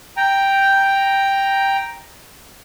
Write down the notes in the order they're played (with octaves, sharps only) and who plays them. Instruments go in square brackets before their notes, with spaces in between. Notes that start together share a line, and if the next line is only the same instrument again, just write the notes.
[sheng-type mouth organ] G5 A#5